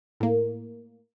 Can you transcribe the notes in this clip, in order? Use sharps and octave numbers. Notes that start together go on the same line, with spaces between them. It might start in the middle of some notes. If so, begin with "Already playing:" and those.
A2 A#3